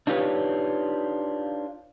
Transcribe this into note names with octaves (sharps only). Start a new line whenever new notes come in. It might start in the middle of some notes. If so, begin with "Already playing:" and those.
D4 D#4 F4 G4 B4 C#5